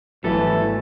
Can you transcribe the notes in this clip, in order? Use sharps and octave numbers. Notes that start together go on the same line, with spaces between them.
G#1 B2 E3 F#3 G3 A3 A4